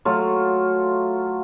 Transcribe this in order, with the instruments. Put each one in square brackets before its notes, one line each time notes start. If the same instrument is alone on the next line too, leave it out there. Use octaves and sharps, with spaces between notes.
[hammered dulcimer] F#3 A3 F4